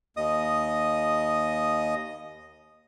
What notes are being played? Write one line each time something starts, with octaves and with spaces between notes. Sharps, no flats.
D#2 D#5 D#6